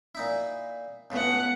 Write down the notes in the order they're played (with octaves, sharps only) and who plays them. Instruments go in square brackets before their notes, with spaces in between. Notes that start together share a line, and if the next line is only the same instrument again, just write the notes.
[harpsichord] A#2 D#4 E4
[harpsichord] C#2 A2 C#3 [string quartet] B3 F#5